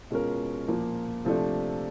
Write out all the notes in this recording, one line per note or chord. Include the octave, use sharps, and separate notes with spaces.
B2 G#3 C#4 F4 A#4
A#2 F3 A#3
C3 F3 A3 D4